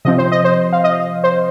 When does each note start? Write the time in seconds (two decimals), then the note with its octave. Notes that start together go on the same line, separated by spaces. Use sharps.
0.05 C3 F3 C4 D#5
0.18 C5
0.32 D#5
0.44 C5
0.73 F5
0.84 D#5
1.24 C5